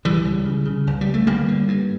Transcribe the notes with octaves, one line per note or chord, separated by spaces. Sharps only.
C#2 E3 G3
C#2
C#3
C#3
C#2
G3
C#2
A3
G1 G3 A#3
D3
G2